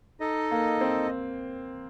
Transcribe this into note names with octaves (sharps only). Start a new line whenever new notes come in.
D#4 A4 D#5
A#3
C4